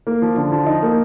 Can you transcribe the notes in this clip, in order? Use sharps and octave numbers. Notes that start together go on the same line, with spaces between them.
A#3
F3
D3
F3
D#4
A#3